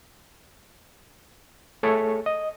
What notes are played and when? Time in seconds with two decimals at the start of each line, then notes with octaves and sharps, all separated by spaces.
1.83 A3 G#4 A4 C#5
2.26 D#5